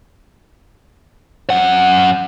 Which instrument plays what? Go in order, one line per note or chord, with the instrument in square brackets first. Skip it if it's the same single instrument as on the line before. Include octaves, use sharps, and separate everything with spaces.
[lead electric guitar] F#2 F#5